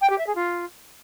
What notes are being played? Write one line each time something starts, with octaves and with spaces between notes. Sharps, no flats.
G5
G4
E5
G#4
F4